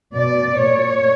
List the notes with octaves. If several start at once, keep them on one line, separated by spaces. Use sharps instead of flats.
B2 D5
A#2 C#5